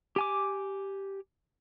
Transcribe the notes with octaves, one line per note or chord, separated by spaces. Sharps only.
G4 G#5 D6